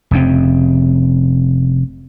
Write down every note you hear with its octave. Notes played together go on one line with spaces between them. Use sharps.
F1 F2 C#3 C4